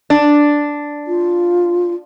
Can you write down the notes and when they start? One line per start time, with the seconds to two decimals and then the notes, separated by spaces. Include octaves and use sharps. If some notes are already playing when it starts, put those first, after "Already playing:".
0.10 D4
1.07 F4